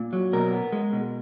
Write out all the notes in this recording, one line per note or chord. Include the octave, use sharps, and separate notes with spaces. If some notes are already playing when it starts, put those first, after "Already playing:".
Already playing: A#2
F#3
B2 A#4
B3
G#3
B2